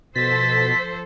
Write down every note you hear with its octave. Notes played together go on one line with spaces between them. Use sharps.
B2 F3 A4 C5 A6 B6